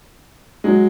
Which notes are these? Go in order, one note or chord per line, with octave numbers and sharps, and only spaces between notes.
F#3 G#3